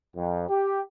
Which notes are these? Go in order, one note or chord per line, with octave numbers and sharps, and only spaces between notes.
F2
G4